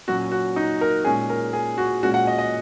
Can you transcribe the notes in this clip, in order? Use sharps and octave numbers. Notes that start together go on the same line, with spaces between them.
A#2 F#3 C#4 F#4
F#4
D#4
A#4
A#2 G#3 C#4 G#4
A#4
G#4
F#4
A#2 G#3 C#4 F#4
F#5
D#5
D#5